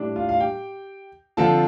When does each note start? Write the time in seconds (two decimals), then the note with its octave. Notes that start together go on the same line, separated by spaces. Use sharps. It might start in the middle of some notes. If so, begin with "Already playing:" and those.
Already playing: A2 G3 D4
0.16 F4 F5
0.29 F5
0.40 G4 G5
1.37 D3 F3 C4 F4 A4 A5